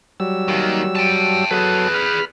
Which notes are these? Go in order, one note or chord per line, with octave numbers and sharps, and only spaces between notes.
F#3 G3 E6
D#2 D#3
G5 A5
F#3 G#4 A4 B4
B5 F6